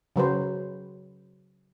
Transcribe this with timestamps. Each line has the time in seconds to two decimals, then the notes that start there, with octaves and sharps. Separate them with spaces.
0.16 C#3 F#3 B4 C5